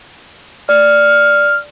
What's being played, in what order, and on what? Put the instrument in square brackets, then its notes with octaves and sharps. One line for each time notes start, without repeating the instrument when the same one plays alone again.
[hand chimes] D5 [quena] F6